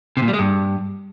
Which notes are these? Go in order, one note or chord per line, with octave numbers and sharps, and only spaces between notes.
C3
A#2
G3
G#3
G2